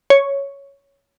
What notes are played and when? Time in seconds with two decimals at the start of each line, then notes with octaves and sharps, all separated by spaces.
0.10 C#5